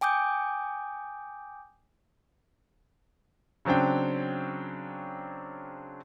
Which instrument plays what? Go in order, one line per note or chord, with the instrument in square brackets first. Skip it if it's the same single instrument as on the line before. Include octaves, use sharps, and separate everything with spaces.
[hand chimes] G5 G#5 D6 D#6 G6
[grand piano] C#3 F#3 C4 D4 G5